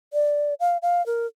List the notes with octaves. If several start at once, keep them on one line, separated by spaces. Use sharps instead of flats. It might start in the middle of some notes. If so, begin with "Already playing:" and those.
D5
F5
F5
A#4